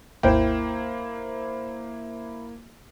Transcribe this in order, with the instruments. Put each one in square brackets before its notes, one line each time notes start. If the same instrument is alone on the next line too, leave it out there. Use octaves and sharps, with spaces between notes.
[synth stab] G#1 D#2 G5 [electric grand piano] A#3 [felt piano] E4 C5